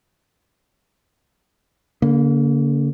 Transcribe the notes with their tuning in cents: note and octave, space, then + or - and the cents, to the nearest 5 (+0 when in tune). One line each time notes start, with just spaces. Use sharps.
D3 -45 A#3 +0